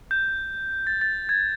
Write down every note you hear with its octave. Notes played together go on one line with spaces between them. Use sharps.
G6
A6
A6
G#6